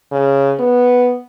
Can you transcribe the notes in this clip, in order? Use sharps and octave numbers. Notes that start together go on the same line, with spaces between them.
C#3
B3